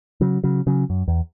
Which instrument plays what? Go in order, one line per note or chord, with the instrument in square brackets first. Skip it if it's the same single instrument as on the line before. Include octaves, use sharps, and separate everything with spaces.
[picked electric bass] C#3 F#3
C#3 F#3
C#3 F#3
F#2
E2